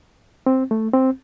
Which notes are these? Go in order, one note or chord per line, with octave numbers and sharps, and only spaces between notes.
C4
A3
C4